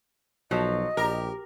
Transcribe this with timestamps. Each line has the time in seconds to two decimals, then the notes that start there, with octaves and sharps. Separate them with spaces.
0.51 B1 F3 F#3 D#5
0.97 A#1 G4 A#4